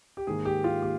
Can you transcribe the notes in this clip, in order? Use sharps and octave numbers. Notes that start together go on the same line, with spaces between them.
G4
G#2 D#3 A#3 G#4
G4
F4
D#3 A#3 G4